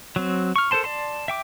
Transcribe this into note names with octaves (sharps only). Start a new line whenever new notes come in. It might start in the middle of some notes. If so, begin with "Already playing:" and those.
F#3 C4
C#6 F6
A4 A#4 C5 A5 C6
D5 A5 C6
E5 G5 D6